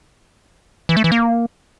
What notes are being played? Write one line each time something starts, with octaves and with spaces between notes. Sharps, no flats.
E3
A3
E3
A#3